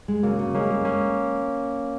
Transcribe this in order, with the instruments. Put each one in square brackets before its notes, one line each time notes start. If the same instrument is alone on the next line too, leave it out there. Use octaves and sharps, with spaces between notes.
[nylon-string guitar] G#3
[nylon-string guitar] C#3 [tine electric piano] F#3 A#3
[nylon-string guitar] C#3
[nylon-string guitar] G#3 [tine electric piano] A#3 C#4
[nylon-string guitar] G#3
[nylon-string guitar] G#3 [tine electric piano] A#3 C#4